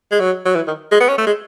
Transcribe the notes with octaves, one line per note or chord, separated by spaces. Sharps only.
G#3
F#3
F#3
E3
D#3
G#3
B3
C#4
A3
G#3